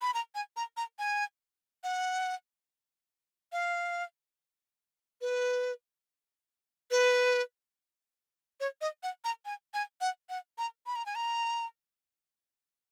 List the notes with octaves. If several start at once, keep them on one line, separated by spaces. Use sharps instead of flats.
B5
A#5
G#5
A#5
A#5
G#5
F#5
F5
B4
B4
C#5
D#5
F#5
A#5
G#5
G#5
F#5
F#5
A#5
B5
A#5
G#5
A#5